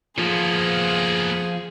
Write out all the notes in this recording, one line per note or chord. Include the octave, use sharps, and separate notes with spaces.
F3 A#3 B3 G#4